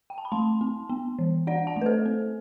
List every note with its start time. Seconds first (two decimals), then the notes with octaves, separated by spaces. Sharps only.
0.10 G5
0.18 A5
0.25 B5
0.32 A3 A5 C6
0.61 C4
0.90 B3
1.19 E3
1.47 D4 D5 F#5
1.67 F#5 A5
1.76 A3
1.81 B4
1.86 A4 C5
2.06 C4